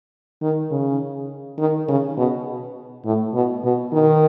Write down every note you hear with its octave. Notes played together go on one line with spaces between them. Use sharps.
D#3
C#3
D#3
C#3
B2
A2
B2
B2
D#3